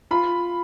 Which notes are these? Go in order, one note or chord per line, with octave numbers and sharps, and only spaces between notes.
F4 B5